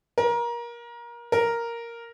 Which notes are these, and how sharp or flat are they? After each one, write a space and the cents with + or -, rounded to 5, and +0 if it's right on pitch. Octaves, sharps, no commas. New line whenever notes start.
A#4 +25
A#4 +0